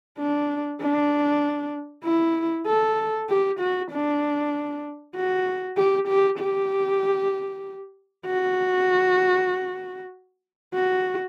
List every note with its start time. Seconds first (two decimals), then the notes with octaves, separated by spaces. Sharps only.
0.19 D4
0.81 D4
2.05 E4
2.67 A4
3.29 G4
3.60 F#4
3.92 D4
5.16 F#4
5.77 G4
6.08 G4
6.39 G4
8.26 F#4
10.74 F#4